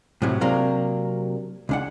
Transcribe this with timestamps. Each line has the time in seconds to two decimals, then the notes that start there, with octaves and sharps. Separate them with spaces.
0.22 A2 C3 F#3
0.41 C3 F#3 A#3 D4
1.69 C#2 D4 F#5